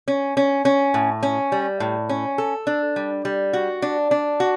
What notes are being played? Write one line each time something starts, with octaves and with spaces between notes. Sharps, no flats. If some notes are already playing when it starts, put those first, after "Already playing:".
C#4
C#4
C#4
A2
C#4
G3
A2
C#4
A4
D4
G3
G3
F#4
D4
D4
F#4